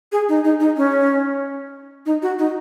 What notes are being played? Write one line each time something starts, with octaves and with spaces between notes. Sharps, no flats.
G#4
D#4
D#4
D#4
C#4
D#4
F#4
D#4